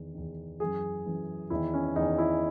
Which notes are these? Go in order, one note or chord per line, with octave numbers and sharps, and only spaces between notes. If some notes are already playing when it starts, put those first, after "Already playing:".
Already playing: E2 D#3
E2 D#3
F#2 E3 G#4
F#2 E3
E2 D#3 E4
C#4
E2 D#3 D#4
E4